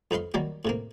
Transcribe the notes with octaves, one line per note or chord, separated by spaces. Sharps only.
F2 D#4 B4 F5 C6
D#3 F#3 G3 A#3
A2 C3 A#3